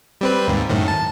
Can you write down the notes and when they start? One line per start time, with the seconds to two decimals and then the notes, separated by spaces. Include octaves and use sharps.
0.21 G3 C4 B4
0.48 D#2 G#2
0.69 F#2 A2 D#3
0.88 A5